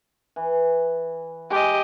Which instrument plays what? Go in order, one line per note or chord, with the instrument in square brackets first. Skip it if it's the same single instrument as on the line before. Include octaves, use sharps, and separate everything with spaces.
[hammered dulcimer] E3
[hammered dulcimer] G#3 [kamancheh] G4 D#5